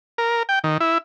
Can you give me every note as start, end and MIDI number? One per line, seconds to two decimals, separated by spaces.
0.18 0.43 70
0.49 0.59 79
0.64 0.78 51
0.80 0.98 64